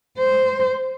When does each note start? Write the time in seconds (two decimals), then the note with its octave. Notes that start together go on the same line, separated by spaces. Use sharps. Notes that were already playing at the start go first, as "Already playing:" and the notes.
0.18 C5